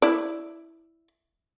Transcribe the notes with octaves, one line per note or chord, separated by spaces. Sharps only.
E4 D5